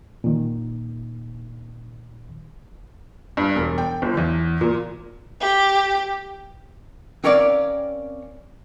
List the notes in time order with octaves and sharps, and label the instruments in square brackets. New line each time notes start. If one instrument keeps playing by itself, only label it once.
[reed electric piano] A#2 D#3
[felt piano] G2
E1
G5
G1
E2
A#2
[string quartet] G4
[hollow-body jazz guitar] C4 C#4 A#4 C#5 D5 F5